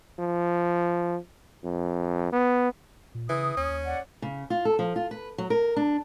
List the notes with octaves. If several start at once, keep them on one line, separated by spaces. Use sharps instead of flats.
F3
F2
B3
A#2
C#3 E3 D#6
D#2 C#4
D#2
D5 F#5
C#3
F4
A4
F3
F4
B4
F#3
A#4
D4